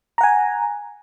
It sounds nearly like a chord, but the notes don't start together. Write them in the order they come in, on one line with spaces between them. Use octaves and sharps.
A#5 F#5 G#5